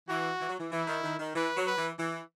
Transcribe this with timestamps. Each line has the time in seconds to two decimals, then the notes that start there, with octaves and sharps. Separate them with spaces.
0.08 E3 F#4
0.40 E3
0.49 F#3
0.60 E3
0.72 E3 E4
0.88 D#3
1.04 D#3
1.19 D#3
1.36 E3 B4
1.57 F#3
1.67 B4
1.78 E3
1.99 E3